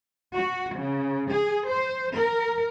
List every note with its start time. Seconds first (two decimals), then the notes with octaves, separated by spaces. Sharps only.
0.34 F#4
0.75 C#3
1.29 G#4
1.67 C5
2.16 A#4